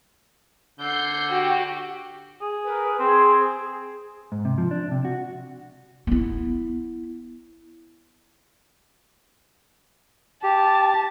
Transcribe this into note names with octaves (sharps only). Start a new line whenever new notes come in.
D3 G6 C7
F#4 G4
G#4
A#4 B4
C4 G#4
G#2
C3
F3
D4
C3
F#4
B3 E4
G4 A5